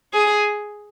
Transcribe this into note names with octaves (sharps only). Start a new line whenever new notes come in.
G#4